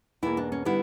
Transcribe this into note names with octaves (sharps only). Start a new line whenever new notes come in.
E2 B2 A#3 E4
D4
C#4
D3 G3 B3 E4